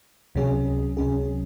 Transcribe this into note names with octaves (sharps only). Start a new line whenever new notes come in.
C#2 C3 F#3 C#4 G#4
C#2 C3 F#3 C#4 G#4